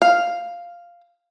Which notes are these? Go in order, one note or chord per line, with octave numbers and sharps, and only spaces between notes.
F5